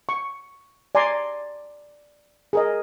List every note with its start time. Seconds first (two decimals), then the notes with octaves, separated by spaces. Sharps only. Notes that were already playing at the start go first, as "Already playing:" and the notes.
0.09 C#6
0.95 D5 G#5 A#5 C6
2.53 G#4 A#4 D#5